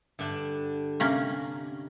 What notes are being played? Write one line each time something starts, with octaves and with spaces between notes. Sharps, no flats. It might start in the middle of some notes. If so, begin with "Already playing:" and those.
G2 D3 D4
C3 A#3 C#4